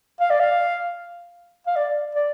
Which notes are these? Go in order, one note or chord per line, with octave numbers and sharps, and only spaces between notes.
F5
D5
F5
F5
D5
D5